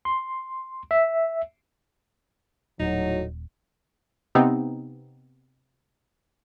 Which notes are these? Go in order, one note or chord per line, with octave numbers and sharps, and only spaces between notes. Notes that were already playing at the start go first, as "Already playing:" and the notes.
C6
E5
D#1 A2 F#3 D#4
C3 B3 C4 D#4